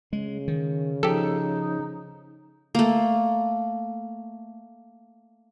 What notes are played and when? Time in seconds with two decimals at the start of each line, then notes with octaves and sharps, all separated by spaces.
0.13 C#3 G#3
0.48 D#3
1.03 F3 D#4 G4 A4
2.75 A3 A#3